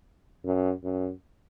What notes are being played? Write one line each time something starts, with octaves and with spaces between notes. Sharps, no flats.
F#2
F#2